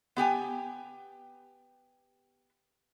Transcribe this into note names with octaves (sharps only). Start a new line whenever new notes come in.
B3 G4 G5 G#5